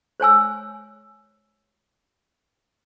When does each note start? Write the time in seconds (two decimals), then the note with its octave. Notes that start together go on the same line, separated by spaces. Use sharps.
0.20 C5 C#5 G#5 E6